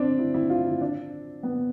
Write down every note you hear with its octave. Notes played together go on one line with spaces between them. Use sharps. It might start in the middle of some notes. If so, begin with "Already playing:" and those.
Already playing: C4 D4
E4
E4
F4
E4
D4
B3